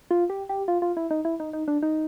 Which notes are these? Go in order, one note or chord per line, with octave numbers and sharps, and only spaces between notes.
F4
G4
G4
F4
F4
E4
D#4
E4
D#4
D#4
D4
D#4